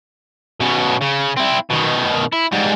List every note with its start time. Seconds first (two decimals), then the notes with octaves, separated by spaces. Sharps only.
0.61 B2 C#4
1.01 C#3
1.37 C4 E4
1.70 B2 D#3
2.32 E4
2.52 G#2 G3